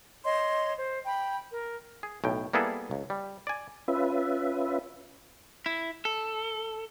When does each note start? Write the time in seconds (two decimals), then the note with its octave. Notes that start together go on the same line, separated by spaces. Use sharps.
0.24 C#5 D#5 C6
0.76 C5
1.05 G5 B5
1.51 A#4
2.03 G#4
2.24 B1 A2 G5
2.53 G3 A#3 B3 E4 G#4 A4
2.91 C#2
3.10 G3
3.47 D5 G#5
3.88 C#4 F4 B4 E5
5.66 E4
6.05 A4